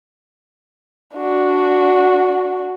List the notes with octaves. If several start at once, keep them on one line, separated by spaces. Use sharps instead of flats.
D4 F#4